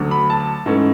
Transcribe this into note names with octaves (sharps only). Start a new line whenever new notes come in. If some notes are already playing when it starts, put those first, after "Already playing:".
Already playing: D2 D3 F#3
B5
A5
G#2 E3 A3 C#4